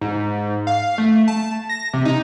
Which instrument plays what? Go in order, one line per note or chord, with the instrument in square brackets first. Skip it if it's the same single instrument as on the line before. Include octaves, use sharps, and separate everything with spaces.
[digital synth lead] G#2
F5
A3
A5
A#6
C3
D#4